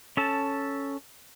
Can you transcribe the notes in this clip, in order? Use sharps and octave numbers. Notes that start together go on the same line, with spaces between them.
C#4 A4 A5